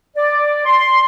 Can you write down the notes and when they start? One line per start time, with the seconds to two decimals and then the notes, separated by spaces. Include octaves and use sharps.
0.16 D5
0.66 C6